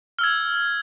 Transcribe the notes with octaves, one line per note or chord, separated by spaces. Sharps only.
E6 F6 G#6